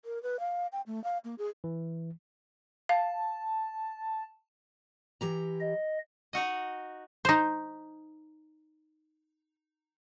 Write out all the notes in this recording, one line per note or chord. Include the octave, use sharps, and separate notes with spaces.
A#4
B4
F5
G5
A3
F5
A#3
G#4
E3
F5 A5
E3 G4 A#5
D#5
D#4 F#4 D#5
D#4 C5